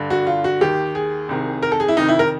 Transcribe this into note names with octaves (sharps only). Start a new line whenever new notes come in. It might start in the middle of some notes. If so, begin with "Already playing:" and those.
Already playing: G2 D3
F#4
F4
F#4
D#2 D#3 G4
G#4
C2 C3 D#3
A#4
A4
G#4
E4
F2 C3 D#3 D#4
E4
A#4